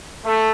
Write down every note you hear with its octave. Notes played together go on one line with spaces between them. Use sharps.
A3